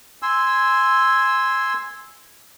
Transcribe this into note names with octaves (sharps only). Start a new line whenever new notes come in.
G#5 C6 E6